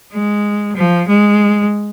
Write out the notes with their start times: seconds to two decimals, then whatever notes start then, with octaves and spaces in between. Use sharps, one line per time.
0.14 G#3
0.77 F3
1.08 G#3